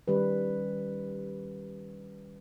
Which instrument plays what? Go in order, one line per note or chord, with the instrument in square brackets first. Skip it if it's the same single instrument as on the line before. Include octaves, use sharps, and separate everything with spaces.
[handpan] D#3 G3 C#4 B4